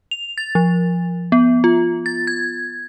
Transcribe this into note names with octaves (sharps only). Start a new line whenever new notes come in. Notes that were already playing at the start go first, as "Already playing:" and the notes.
F7
A6
F3
B3
F4
A6
G#6